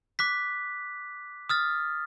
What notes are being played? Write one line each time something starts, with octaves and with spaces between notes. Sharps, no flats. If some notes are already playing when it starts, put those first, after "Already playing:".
D6 F#6 B6
D#6 F6 A6